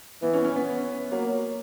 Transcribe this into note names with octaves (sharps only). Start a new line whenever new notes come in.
E3 B3
C#4
C#4
B3
F#3 A#3